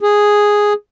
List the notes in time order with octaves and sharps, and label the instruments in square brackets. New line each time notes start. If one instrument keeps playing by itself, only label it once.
[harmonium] G#4